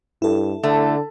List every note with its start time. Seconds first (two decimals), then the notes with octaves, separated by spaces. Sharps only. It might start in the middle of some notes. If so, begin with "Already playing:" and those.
0.22 G2 E4 A4
0.63 D3 A3